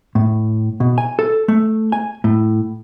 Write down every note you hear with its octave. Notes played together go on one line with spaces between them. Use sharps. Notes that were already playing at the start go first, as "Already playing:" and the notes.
A2
B2
G#5
A4
A3
G#5
A2